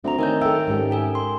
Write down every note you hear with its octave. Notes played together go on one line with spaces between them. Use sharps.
D2 A3 C4 A#5
D#3 C#5 D#5 E5 G#5 G6
A4 E5 G5 E6
G#2 C#4 G4
A4 A#4 G#5
C6